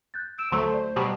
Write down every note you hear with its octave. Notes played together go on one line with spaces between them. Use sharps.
F#6 G6 A6
E6 D7 E7
D2 F#3 A3 A4 C5 A5 C6
D5
B2 F#3 G3 G4